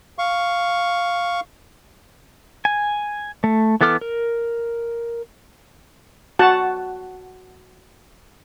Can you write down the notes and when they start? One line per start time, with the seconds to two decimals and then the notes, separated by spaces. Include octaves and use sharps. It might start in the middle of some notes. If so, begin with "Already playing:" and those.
0.18 F5 C#6
2.65 G#5
3.44 A3
3.81 E3 B3 A4 D6 F6
4.01 A#4
6.39 F#4 F#5 A5